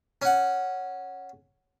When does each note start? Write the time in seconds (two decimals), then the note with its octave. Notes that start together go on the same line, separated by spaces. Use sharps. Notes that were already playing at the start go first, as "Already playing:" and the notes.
0.22 C#4 F#5